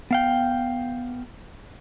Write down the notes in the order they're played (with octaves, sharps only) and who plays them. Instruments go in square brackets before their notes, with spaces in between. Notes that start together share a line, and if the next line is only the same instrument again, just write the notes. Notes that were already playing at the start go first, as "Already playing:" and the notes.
[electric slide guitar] B3 F5 G5